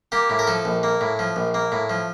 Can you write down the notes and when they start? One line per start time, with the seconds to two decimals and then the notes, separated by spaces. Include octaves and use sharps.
0.12 A#3 G4
0.30 A2
0.39 A#4
0.47 F3 A4
0.65 A#1
0.83 A#3
1.01 A2
1.19 F3
1.36 A#1
1.54 A#3
1.72 A2
1.90 F3